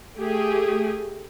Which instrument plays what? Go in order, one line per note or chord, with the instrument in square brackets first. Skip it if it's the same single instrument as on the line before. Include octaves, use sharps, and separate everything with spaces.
[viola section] A3 G4 G#4